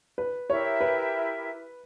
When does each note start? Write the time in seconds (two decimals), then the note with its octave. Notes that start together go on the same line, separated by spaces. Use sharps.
0.18 B4
0.50 E4 G4 A#4 C#5 E5
0.81 B4